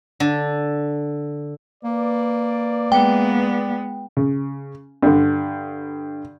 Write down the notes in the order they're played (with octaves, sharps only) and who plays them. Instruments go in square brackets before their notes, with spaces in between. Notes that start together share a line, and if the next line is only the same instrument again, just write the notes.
[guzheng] D3
[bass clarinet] A#3 [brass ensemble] B4 D5
[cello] G#3 B3 [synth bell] G5
[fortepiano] C#3
G2 D3